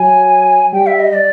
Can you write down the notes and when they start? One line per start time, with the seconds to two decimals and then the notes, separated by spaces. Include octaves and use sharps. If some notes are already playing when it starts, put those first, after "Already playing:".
Already playing: F#3 G#5
0.72 G3 G5
0.86 E5
1.00 D#5
1.13 D5